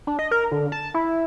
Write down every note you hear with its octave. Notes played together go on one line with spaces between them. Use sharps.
D4
D#5
A#4
D3
A5
E4